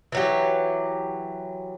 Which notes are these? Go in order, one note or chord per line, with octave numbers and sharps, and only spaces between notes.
E3 F#3 G4